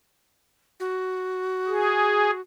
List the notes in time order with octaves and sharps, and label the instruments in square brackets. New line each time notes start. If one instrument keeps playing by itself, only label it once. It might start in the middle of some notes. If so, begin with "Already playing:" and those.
[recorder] F#4
[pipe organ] G#4